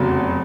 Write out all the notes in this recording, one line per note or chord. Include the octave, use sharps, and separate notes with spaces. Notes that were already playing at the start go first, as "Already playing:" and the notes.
Already playing: F1 E2 C#3 F#3